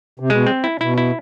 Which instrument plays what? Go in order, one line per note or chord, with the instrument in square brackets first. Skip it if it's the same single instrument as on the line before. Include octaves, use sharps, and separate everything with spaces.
[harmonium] C3
[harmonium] B2 [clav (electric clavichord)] G#3
[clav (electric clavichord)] C4
E4
[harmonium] B2 [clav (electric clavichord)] E4
[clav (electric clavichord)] E4